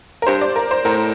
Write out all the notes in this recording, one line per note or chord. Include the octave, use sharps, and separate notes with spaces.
A#4
G2 C5
D5
A#4
C5
A2 A#4